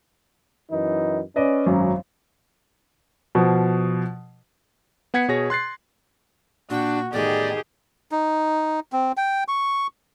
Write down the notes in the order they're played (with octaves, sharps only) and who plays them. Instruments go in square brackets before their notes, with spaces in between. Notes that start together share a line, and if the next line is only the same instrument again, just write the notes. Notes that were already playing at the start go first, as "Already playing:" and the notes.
[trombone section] F#2 E3 D#4
[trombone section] C#4 [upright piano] B4 D5 D#5
[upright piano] G#1 F#2 F#3
[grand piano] B2 F3
[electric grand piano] B3 F#5 G#6 B6 C#7
B2 G#4 C#5 A#6
C6 F#6 A6 C7
[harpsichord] A#2 G5 [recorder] D4 [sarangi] F#4
[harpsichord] E2 A2 A3 [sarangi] D#3 [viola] G4 G#4 [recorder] D5
[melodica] D#4
C4
G5
C#6